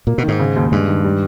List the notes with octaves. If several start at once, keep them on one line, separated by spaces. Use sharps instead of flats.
A#2 A#3
B2
G#2 D#3
C#3
D#2
G2 G#3
D#3
G3